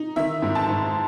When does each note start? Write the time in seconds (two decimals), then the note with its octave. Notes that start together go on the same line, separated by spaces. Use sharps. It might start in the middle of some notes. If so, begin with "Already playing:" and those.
Already playing: D#4
0.16 D#3 E5
0.42 G#2
0.55 A5
0.69 G#2